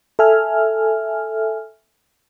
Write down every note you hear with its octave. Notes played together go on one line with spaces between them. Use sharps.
A4 E5 G#5 F6